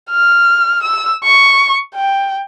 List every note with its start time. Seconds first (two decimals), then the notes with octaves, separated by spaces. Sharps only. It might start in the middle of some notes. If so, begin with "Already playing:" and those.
0.11 F6
0.83 E6
1.24 C#6
1.95 G5